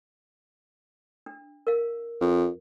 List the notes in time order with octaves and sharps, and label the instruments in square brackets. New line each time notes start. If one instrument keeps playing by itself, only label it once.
[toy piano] D4
A#4 F5
[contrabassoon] F2